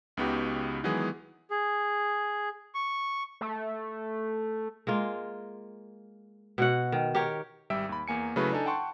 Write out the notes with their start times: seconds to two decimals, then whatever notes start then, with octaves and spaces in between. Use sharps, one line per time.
0.17 C#2 C#3 B3 D#4 F#4 G4
0.84 D#3 E3 F#3 G#3 B3 G#4
1.51 G#4
2.75 C#6
3.41 A3
4.87 G#3 A#3 F4
6.58 B2 F#4 F#5
6.92 D#3
7.15 G4 A#4 C#5
7.70 G#1 G3 E5 G5 E6 D7
7.89 D#2 B5
8.08 E2 A#3 G#5 C#7
8.36 C#3 F#3 A3 E4 F#4 B4
8.52 D4 D#4 A4 G#5
8.66 F#5 G5 A5 C6 C#6